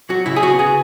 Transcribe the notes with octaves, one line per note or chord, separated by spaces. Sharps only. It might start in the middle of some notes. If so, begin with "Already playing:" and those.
F#3 F#4
C#3 E4
G#4
B3 F#4
C#3 G#4